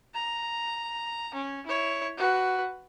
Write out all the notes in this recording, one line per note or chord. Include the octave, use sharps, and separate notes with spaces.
A#5
C#4
E4 C#5
F#4 B4